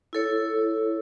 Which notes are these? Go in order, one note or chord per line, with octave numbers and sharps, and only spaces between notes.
E4 A4 C#5